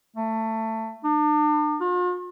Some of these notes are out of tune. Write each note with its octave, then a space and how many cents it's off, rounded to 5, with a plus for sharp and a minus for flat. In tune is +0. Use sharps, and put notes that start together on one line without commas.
A3 +20
D4 +35
F4 +45